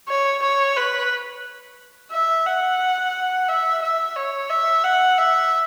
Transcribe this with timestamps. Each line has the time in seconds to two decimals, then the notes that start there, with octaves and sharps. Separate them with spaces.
0.08 C#5
0.43 C#5
0.77 B4
2.12 E5
2.46 F#5
3.48 E5
3.82 E5
4.16 C#5
4.50 E5
4.83 F#5
5.18 E5